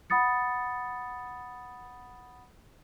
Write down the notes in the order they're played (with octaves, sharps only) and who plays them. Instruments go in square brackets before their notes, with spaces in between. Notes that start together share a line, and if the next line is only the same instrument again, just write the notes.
[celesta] F#5 B5 D#6 A6 C#7